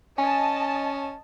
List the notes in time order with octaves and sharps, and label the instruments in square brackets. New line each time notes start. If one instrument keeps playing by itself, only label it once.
[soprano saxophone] C#4 [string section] D#5 A5 [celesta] G#5